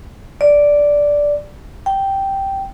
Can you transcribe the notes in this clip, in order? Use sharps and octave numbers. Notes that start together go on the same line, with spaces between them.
D5
G5